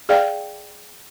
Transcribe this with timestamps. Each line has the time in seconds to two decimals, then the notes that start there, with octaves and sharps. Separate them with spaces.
0.09 G#4 D5 F5 G5